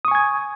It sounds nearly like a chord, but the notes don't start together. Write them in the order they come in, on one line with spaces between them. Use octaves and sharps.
D#6 C#6 G#5 G#6